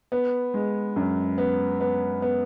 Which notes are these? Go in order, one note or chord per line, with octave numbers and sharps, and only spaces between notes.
B3
G#3
F#2
B3
B3
B3